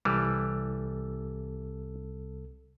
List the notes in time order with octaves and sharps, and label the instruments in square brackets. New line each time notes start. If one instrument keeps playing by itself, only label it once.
[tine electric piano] C2 A4 [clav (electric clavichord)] E3 G3